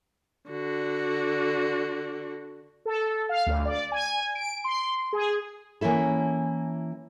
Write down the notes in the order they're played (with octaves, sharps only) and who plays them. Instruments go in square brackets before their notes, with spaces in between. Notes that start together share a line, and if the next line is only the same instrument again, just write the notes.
[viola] D3 F#4
[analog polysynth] A4
F5
D2
D5
G#5
D7
C6
G#4
[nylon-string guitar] E3 A#3 C#4 E4 A4